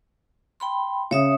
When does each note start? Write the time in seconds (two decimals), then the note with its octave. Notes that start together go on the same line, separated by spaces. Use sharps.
0.60 G5 B5 C6
1.11 C#3 C#5 E5 D#6